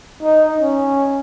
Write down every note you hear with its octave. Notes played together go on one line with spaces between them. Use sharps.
D#4
C#4